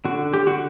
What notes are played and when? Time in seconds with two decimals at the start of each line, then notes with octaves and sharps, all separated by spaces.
0.05 D3 F#4
0.34 G4
0.47 D3 F#4